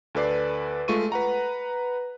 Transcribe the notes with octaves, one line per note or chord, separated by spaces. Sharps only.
D2 A4 B4 D5 C7
G#3 A3 F4 C#6 D#7
B4 F#5 A#5